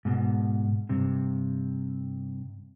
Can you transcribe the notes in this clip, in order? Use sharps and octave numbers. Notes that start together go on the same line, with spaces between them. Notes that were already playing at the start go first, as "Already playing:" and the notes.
G#2 B2
G2 C3